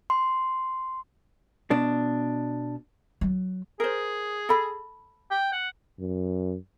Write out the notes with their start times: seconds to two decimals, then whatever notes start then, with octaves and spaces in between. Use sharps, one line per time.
0.10 C6
1.71 B2 D4
3.21 F#3
3.80 G#4 A#4 C5
4.49 A4 B5
5.31 G5
5.52 F#5
5.99 F#2